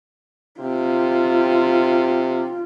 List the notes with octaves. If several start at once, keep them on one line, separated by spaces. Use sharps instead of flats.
C3 F4